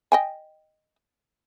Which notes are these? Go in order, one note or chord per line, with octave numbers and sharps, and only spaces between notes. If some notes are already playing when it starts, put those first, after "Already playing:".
D#5 G5 G#5